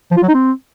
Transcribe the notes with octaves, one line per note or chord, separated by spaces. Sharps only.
F3
F4
F#3
D#4
C4